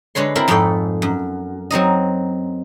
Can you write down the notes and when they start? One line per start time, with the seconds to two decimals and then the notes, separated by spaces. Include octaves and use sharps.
0.15 D3 G#3 B4 C#5 C6
0.35 C4 E4 A#4 B5
0.48 F2 G#2 A3 G#4 A4 G5
1.02 F#2
1.70 F#3 C4 D#4 D#5